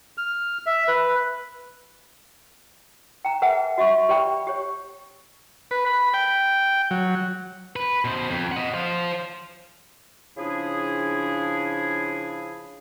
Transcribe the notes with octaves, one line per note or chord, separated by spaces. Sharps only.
F6
E5
B4
G5 A#5
G#4 A#4 B4 E5 F#5 G#5
F#4 E5 C#6
G4 B4 D5 G5 B5
G4 C#5
B4
B5
G5
F#3
B4
B2 C5
F2
D#5 F#5
C5 F5
C#3 F3 D4 E4 G#4